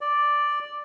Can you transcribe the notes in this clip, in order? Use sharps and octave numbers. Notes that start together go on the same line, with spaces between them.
D5